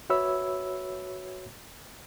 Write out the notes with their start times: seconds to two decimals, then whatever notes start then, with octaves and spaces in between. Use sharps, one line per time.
0.10 F#4 B4 C#5 E5 B5 E6